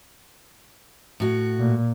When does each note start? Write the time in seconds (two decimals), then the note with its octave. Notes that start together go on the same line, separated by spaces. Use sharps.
1.20 A2 F#4
1.59 A#2